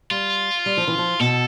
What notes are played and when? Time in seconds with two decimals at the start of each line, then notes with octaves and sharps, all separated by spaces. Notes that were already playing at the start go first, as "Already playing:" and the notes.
0.11 G3 F4
0.66 G3
0.77 F3
0.88 E3
0.98 F3
1.20 B2 A4